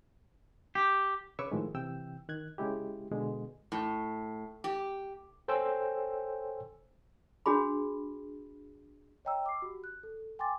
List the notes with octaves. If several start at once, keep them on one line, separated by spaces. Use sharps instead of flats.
G4
C#3 B4 C#5 C#6 D6 E6
A2 D#3 F3 G#3
C3 E3 G5 E6
D#3 F#6 G#6
C#3 G#3 E4 G4
B2 D3 G#3
A2
G4
A4 C5 C#5 G5 G#5 E6
D4 F#4 G#4 B5
C#5 D#5 G5 A#5 E6
D6 C7
F#4 G4
F#6
A4
G5 G#5 C6 D6 A6